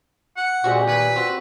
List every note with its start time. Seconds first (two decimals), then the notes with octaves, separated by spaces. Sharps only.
0.37 F#5
0.64 A#2 G#3 C4 F#4 G4
0.87 D#2 B4
1.16 C4 F#4